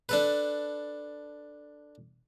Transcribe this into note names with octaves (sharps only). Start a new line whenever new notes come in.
D4 A4 B4